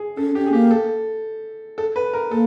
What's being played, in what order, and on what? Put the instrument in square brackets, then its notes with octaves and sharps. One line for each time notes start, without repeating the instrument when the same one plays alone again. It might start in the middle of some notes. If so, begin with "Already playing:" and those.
Already playing: [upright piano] G#4
[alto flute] C#4 [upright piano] A4
[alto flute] C#4 [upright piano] G4
[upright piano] G#4
[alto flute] A#3 [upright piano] G4
[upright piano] A4
A4
B4
A#4
[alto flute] A#3 [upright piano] A4